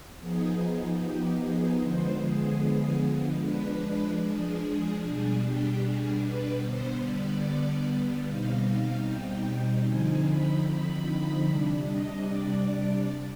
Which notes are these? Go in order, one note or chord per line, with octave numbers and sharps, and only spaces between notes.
F3 B3 D#4 G#4
G4
G#4
D3 F3 G#3 B3 C5
G#4
F3 G#3 D4 B4
B4
G#4
G#4
B2 G3 D4 G#4
G4
G#4
B4
D3 G3 B3 C5
D5
B2 G3 C4 D#4 F5
F5
G5
D3 F3 C4 D#4 G#5
B5
B5
C3 G3 D4
D#5
D5